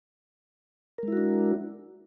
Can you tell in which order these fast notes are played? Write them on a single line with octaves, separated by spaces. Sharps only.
A#4 G#3 E4 F#4 D4